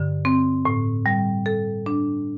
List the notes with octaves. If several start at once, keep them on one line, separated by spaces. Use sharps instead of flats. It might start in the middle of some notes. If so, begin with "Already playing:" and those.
Already playing: G2 D3
C4
A2
G3
A4
D4